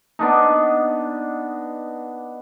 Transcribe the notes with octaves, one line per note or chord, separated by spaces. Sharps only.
B3 D4 D#4